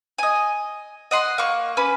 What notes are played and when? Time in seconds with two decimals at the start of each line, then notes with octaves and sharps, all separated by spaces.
0.18 D#5 G#5
1.11 D#5 F#5 C6
1.38 A#3 C#6
1.77 C#4 B4